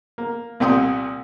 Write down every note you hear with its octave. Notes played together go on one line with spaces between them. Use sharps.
A#3
C2 A#2 G5 C6 D#6